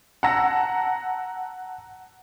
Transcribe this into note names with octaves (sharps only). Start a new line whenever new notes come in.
F#5 A5 A#5 E6 A#6